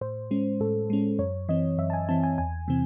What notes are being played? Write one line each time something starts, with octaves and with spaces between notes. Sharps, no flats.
A2 C5
G#3 C#4
A2 A4
G#3 C#4
F#2 C#5
E3 C4 D#5
F#2 E5
A5
G#5
E3 C4 A5
G#5
E2 G#5
C3 E3 C4